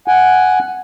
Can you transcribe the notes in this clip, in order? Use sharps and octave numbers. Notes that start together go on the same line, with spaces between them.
F#5 G#5